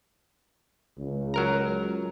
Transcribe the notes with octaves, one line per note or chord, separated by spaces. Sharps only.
C#2
F#3 A#4 A#5